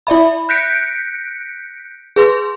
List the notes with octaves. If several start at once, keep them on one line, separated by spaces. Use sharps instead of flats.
E4 D5 E5 B5
F#6 G6 A#6 B6 C#7 D7
G#4 B4 C6